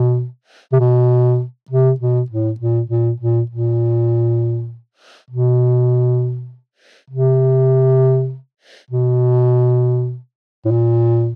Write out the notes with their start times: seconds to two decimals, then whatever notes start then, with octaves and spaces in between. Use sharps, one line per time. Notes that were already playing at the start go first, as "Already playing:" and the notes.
Already playing: B2
0.73 C3
0.80 B2
1.71 C3
2.00 B2
2.31 A2
2.60 A#2
2.90 A#2
3.20 A#2
3.50 A#2
5.30 B2
7.11 C3
8.91 B2
10.65 A2
10.71 A#2